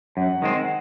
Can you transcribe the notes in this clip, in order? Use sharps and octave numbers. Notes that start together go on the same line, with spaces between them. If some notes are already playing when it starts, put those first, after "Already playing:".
F#2 F#5
D#3 G#3 C4